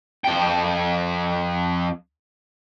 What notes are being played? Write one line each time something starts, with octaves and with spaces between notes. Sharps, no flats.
F2 G5